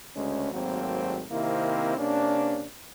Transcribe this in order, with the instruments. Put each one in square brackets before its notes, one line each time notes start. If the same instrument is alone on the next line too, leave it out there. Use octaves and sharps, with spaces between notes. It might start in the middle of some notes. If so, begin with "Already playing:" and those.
[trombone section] D2 C#3 G#3 C#4
G#1 D#2 F#3 A3 A#3 C4
C3 D#3 A#3 C4 E4
C3 A#3 C#4 D4